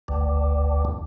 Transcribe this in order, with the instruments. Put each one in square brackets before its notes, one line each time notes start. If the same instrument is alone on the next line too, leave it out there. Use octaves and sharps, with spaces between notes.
[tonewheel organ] G1 D2